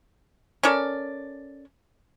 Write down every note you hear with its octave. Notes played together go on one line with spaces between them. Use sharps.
C#4 A4 A#4 D5